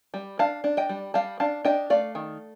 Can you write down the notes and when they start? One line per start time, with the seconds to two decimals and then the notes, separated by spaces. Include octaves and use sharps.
0.14 G3
0.39 D4 F5 A5
0.64 D4
0.77 D#5 G5
0.89 G3
1.14 G3 F5 A5
1.40 D4 F5 A5
1.65 D4 D#5 G5
1.90 A3 D5 F5
2.15 D#3